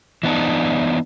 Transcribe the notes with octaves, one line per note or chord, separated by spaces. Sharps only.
E3 B3 D4 D#4